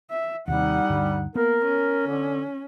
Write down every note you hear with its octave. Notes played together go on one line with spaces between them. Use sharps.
E5
D#2 C3 G3 D#4 F#5
D2 G2 D3
A#3 B3 A#4
C#4
D3